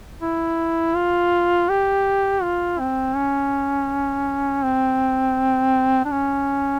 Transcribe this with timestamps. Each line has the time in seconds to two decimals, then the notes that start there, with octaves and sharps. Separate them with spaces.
0.21 E4
0.95 F4
1.69 G4
2.42 F4
2.79 C4
3.16 C#4
4.64 C4
6.05 D4
6.11 C#4